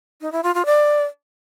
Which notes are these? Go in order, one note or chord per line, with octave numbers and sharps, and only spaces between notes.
D#4
E4
F4
F4
D5